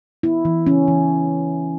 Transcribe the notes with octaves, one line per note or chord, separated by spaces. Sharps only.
B3 E4
E3
E3 C#4
E3